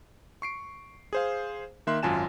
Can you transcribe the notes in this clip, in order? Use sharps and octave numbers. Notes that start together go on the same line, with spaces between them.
C#6 C7 D7
G#4 C5 F5
D#3 A#3 E5 C6 F#6
G#1 F#2 F4 G#5 A5 E7